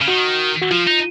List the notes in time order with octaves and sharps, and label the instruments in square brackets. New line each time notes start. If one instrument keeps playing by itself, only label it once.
[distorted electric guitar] C#3
[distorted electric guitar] D#3 [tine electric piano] F#4
[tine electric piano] F#4
[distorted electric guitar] F3 [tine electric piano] F4
[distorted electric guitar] D#4